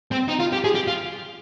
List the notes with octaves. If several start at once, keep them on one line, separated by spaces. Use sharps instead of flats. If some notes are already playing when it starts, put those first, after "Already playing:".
C4
D#4
F4
G4
G#4
G4
F4